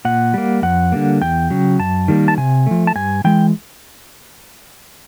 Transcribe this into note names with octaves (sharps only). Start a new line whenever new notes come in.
A#2 F#5
G3 A#3
F2 F#5
D3 G3 A#3
E2 G5
C#3 F#3
F#2 A5
D#3 G3 A#3
A5
C3 G#5
F3 A3
A5
G2 G#5
E3 G#3 G5